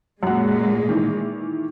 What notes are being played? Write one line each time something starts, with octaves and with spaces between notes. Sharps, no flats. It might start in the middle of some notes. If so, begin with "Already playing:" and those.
F#2 A#2 G#3 F#4
D#3 E3